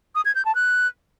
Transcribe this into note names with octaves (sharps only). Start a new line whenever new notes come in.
D#6
G#6
G6
A5
F#6